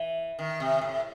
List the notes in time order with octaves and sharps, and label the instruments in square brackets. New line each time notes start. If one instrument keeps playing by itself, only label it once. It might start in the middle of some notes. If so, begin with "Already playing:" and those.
Already playing: [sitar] E3
D#3
C3
A2